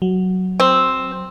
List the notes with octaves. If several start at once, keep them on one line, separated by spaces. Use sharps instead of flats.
F#3
C4